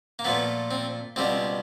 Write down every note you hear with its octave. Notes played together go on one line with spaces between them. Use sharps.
A#3
A#2 F3 A3 B3
C4
C#2 B2 G3 C4